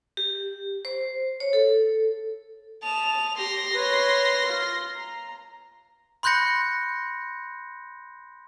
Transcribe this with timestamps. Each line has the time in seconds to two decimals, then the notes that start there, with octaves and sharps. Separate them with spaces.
0.17 G4
0.85 C5
1.40 C#5
1.53 A4
2.83 A5 D#6 F7
3.37 G4 C6 A#6
3.73 B4 C#5
4.45 F4
4.95 A#5
6.23 B5 C6 F#6 G6 A#6 C#7